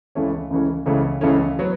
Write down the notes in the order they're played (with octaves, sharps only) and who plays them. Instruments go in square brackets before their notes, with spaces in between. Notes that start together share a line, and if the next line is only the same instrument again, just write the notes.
[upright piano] C#2 C#3 E3 A3 C#4
C#2 C#3 E3 A3 C#4
C#2 C#3 E3 A3 C#4
C#2 C#3 E3 A3 C#4
F#3 B3